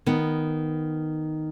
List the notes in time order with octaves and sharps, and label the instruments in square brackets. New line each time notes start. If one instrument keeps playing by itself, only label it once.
[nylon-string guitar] D#3 B3